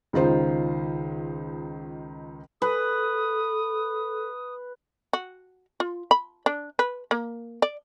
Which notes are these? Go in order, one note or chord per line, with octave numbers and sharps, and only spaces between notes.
C#2 D#3 D#4 F4 C5
A4 B4 D#6
F#4
F4
B5
D4
B4
A#3
D5